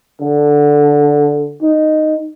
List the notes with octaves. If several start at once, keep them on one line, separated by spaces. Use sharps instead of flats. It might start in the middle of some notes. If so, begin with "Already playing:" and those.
D3
D#4